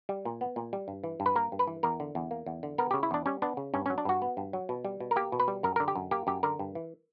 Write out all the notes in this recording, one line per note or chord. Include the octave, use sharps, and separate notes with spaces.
G3
A#2
B3
A#2
G3
G2
E3
G2
B4
A#3 A#4
G2
B4
E3
E2 A#4
D3
E2
A#3
E2
D3
B3 A#4
C#3 G4
E4
E2 D4
G3 C#4
B3 D4
C#3
G2 C#4
C#4
F#3
D4
G2 F#4
B3
G2
F#3
B2
G3
B2
A#4
A#3 G4
B2
B4
G3
F#2 A#4
A#4
D3
G4
F#2
A#3 G4
F#2 G4
D3 A#4
G2
E3